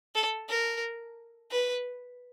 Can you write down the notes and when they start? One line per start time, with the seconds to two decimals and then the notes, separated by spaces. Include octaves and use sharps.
0.15 A4
0.49 A#4
1.51 B4